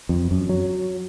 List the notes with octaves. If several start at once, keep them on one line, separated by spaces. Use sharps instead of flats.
F2
F#2
F#3